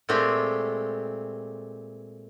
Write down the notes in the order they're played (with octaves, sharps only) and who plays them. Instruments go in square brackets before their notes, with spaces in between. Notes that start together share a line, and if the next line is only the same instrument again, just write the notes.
[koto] A#2 G#3 A3 C4 G4